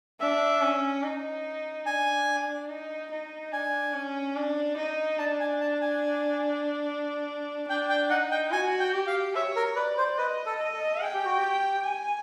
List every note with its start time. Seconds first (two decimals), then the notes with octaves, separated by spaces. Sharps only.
0.20 D4 E5
0.61 C#4
1.03 D#4
1.86 D4 G#5
2.69 D#4
3.11 D#4
3.52 D4 G#5
3.94 C#4
4.36 D4
4.77 D#4
5.19 D4 A5
5.40 G#5
5.61 A5
5.81 G#5
7.68 D4 G5
7.89 G5
8.10 D#4 F#5
8.31 G5
8.52 F#4 G#5
8.80 G5
8.93 G4
9.07 F5
9.35 C#5 E5
9.56 A#4
9.76 B4 D5
9.98 C5
10.18 B4 D#5
10.46 A4
10.60 D#5
10.74 A4
11.01 G#4 G5
11.14 G4
11.25 F#4
11.37 G4
11.84 G#5